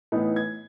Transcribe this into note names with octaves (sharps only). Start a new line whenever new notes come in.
A2 E3 B3 D#4
G#6